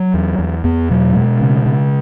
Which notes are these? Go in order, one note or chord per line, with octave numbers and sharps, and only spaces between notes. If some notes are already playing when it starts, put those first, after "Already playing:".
Already playing: F#3
E2
E2
E2 B3
B2 F#3
B2 G#3
C#3
C#3